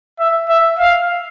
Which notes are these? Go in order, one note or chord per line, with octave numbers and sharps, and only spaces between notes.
E5
E5
F5